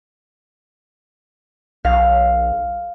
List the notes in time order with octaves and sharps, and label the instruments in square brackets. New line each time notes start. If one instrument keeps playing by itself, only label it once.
[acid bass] B1 [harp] F5